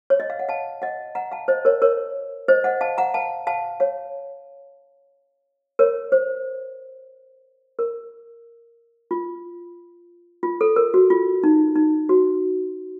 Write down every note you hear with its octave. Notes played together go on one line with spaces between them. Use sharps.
C#5
D#5
F5
F#5
F5 A5
D#5 F#5
F#5 A#5
F5 A5
C5 D#5
A#4 C#5
A#4 C#5
C5 D#5
D#5 F#5
F5 A5
F#5 A#5
F5 A5
F5 A5
C#5 F5
A#4 C#5
C5
A#4
F4
F4
A4
A#4
F#4
F4
D#4
D#4
F#4